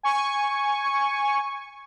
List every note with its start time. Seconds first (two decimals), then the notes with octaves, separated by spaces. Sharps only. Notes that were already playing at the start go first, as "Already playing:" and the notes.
0.03 G#5 C#6